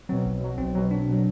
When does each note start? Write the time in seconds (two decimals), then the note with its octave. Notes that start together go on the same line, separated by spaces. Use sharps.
0.09 B2 F#3 C4
0.25 B1
0.41 B2 F#3
0.58 B1 C4
0.75 B2 F#3
0.91 B1 D4
1.08 B2 F#3